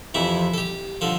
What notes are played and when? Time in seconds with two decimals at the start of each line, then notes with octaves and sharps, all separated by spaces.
0.14 F2 C3 E3 E4
0.54 A4
0.58 G4
1.01 D3 F3 A4